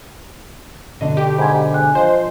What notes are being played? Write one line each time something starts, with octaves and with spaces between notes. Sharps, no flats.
B2 D3 D4 D#5
G4
G#2 B5 G#6
G#5 F#6
F3 C5 D#5